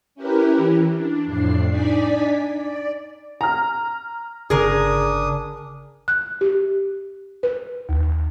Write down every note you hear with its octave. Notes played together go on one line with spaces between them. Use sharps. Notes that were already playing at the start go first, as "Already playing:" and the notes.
C#4 E4 G4 A#4 B4
E3
D4
F2 A2 D4 C7
D4 D#4 D5 G#5 B6
D5
A#5 F6
G1 C#3 D4 G#4 A#4 D#6
F#6
G4
B4
D#2